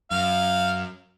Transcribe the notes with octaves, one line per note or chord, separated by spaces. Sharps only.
F#2 F5